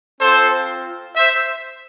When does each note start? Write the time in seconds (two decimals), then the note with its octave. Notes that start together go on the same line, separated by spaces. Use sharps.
0.20 C4 F4 A4 C5
1.17 C5 E5